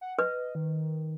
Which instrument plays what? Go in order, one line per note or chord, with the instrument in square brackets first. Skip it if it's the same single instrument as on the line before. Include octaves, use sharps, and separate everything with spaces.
[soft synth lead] F#5
[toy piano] B4 [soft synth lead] D#5
[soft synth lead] D#3